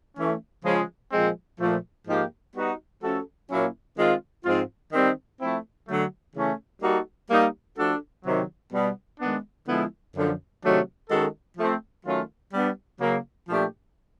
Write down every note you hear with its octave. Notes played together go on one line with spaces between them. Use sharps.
E3 A3 C#4
C#3 F3 G#3
A#2 F3 G#3 C4
A#2 F3 A3
G#2 F3 A#3 D#4 G4
G3 B3 D#4 F#4
F3 A3 C#4 F#4 A4
A#2 F#3 A#3 C#4 E4
D#3 G#3 C4 F4
G#2 F3 G#3 C4 F4
D#3 G3 C4
F3 A3 C4 E4
D3 F#3 A3
C#3 E3 A3 C#4
G3 A#3 D#4 F#4 A4
G3 A#3 D#4
F3 A3 D4 F#4 A4
C3 D#3 F#3
B2 G3 B3
D#3 G#3 B3 D4
D3 F3 G#3 B3 E4
F#2 D3 F3
C3 D#3 F#3 A3 D4
D#3 G#3 C#4 F#4 A4
F3 A3 C4
D#3 F#3 A3 C#4 F4
G3 B3 D4
C#3 F#3 A#3
A#2 F3 A3 D4 G4